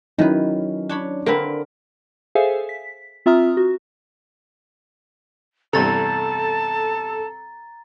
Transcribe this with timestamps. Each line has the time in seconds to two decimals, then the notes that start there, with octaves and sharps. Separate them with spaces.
0.19 D#3 F#3 C#4 D#4 E4 B4
0.89 D4 C#5 B5
1.26 D3 A#3 C4 A#4 B4
2.35 G#4 A4 C5 E5 F5 G#5
2.69 B6
3.26 C4 F4 E5 A#5 D#6 F6
3.57 F#4
5.73 E2 G2 C3 A4 A5 A#5 A6